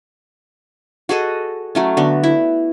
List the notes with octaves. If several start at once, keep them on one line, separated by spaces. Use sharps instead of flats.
F#4 G#4 A4 D#5
F#3 A3 C#4
D3 B3 F#4
E4